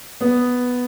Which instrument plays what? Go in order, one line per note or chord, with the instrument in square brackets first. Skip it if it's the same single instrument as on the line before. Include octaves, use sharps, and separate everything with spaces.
[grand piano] B3